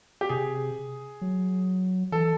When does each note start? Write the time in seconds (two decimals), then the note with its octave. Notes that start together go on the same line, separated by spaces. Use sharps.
0.21 G4
0.29 C3 G#4
1.21 F#3
2.12 E3 A4